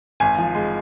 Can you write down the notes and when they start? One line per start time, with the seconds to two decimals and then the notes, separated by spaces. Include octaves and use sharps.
0.20 G#1 G#5
0.38 F3
0.55 G#3